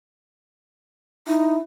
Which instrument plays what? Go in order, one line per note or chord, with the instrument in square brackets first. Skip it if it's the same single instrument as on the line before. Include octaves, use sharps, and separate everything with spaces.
[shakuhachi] D#4 [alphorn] E4